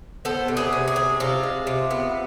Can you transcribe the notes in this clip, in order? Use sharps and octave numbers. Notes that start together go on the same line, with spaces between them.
B3 A4 C5
C3
G#4 B4
C3
G#4
C3
C3 F4
G#3
C3
B3